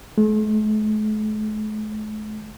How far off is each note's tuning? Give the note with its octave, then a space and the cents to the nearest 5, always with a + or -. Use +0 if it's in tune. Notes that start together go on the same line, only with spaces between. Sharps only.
A3 -45